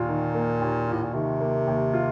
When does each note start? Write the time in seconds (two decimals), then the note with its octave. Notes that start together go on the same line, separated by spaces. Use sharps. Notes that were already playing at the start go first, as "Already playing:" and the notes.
Already playing: D#2 A#2 F4
0.09 D#3
0.35 A#3
0.61 D#2
0.88 F4
0.93 A2
1.03 A#2
1.14 C3 D#3
1.41 A#3
1.67 D#2
1.94 F4